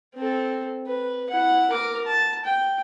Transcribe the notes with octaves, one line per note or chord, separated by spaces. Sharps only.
C4 A4
B4
E4 F#5
A#4 D6
A5
G5